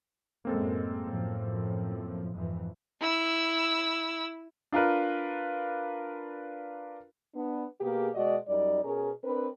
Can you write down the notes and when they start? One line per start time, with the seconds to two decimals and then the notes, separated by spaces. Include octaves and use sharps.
0.45 F#2 A2 G#3 A#3 C4 A4
1.03 F#2 A2 F3
2.33 F2 G#2 E3
3.00 E4 E6
4.72 D4 F4 A#4 B4
7.35 B3 D4
7.81 B2 A#3 G4 G#4
8.14 B2 G#3 F#4 D5 D#5
8.48 F#2 G3 D#4 D5
8.84 B2 C#4 G#4 A#4
9.24 C4 D4 A#4 B4